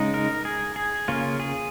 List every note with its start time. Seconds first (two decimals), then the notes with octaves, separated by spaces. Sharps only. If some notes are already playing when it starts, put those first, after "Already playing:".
Already playing: C#3 G#3 D#4
0.14 A#4
0.45 G#4
0.76 G#4
1.08 C#3 A#3 C#4 F4
1.40 G#4